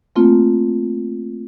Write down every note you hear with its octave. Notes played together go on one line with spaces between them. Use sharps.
A3 A#3 C4 F4